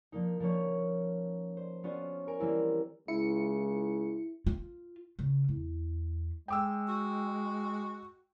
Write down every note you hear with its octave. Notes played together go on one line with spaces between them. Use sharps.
F3 A#3 D#4
F3 A#3 C#4 C#5
C5
B3 C#4 F4 F#4 C5
A#4 G#5 D7
E3 G3 A#3 C4 E4 F4
C#2 E4 C#7
F4
C#3
E2
G#3 G5 D6 E6
F#4